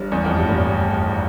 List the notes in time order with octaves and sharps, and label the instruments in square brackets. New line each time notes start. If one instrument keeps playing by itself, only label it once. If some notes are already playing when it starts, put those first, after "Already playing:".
Already playing: [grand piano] G1 G2
E2
F2
G2
A1 A2